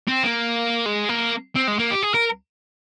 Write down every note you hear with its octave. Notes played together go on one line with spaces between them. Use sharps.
C4
A#3
G#3
A#3
C4
G#3
A#3
G4
G#4
A#4